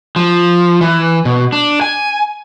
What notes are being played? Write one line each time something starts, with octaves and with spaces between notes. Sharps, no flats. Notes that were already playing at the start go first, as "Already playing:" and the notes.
F3
E3
B2
D4
G#5